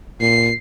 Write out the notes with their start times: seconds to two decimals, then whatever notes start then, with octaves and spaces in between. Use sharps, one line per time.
0.21 A#2 C7